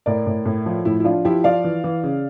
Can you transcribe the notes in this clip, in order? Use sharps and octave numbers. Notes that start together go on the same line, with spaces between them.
A2 A#4 D5
A2
A2
F3
A2 E4
E4
F3 D4 F4
F3 E4 G4
F3 D5 F5
E3
E3
C#3